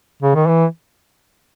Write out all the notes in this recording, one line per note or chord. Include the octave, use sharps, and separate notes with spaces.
C#3
D#3
E3